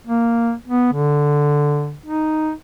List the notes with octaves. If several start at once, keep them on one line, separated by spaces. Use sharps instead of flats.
A#3
B3
D3
D#4